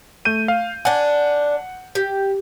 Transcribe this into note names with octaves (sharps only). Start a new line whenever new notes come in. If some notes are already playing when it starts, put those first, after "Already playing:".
A3 G6 D#7
F5
D4 F#5 G#5
G4